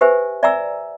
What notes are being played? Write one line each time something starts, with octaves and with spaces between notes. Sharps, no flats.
G4 B4 C5 E5 G#5
D5 E5 G#5 A#5 E6